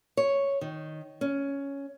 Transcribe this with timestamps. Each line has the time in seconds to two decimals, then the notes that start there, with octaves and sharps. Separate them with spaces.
0.17 C#5
0.61 D#3
1.21 C#4